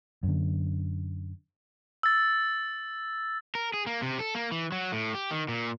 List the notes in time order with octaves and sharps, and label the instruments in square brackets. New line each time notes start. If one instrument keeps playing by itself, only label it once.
[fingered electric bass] F#2 D3
[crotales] E6 A6
[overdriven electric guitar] A#4
G#4
A#3
C3
A4
A#3
E3
F#3
A2
G4
D#3
A#2